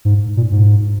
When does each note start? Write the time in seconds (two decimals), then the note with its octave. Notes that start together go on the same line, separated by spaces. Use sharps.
0.05 G#2
0.37 A#2
0.52 G#2